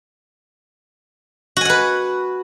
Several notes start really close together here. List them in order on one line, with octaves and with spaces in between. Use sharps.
F#4 G#5 F#5 B4